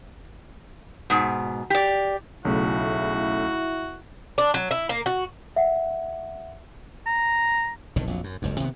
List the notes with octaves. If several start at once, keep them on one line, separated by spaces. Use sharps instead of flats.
G#2 B2
G4 D5
B1 C#3 A3 E4 F#4
D4
F#3
E4
A#3
F#4
E5 F#5
A#5
F1 B1 A2 D#3
A#1 F2 F#3
F#2
F#1 C#2 G2
C3 D#3 A#3 B3